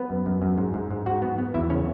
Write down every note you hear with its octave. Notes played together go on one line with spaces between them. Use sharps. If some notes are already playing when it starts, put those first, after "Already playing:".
Already playing: B3 B4
F#2
F#2
F#2
G#2
G#2
G#2
G#2 F#4 F#5
B3
B3
E2 E4 E5
C#3 C#4 C#5